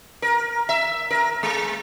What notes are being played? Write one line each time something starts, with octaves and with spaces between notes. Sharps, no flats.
A#4
E5
A#4
G#3